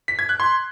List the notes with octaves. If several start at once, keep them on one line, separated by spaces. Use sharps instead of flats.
B6
G#6
F#6
C6